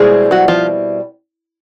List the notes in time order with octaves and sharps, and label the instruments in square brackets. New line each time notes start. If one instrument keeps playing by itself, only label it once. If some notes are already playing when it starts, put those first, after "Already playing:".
Already playing: [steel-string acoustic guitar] B2 G3 C4 E4 [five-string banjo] G#3 G#4
[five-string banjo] F#3 F#4
F3 F4